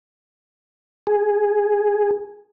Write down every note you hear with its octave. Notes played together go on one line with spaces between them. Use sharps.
G#4